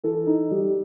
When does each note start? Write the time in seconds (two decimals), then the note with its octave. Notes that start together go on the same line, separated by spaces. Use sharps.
0.04 E3 A4
0.27 D#4
0.51 G3